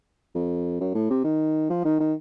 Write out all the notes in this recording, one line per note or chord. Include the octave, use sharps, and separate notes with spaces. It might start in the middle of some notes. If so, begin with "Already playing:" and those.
F2
F#2
A2
C3
D#3
F3
D#3
D#3